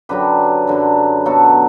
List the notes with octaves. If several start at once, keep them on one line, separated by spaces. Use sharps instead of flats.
F#2 D3 F#3 G4 B4
F#2 D3 F#3
B2 F#3 F#4 A4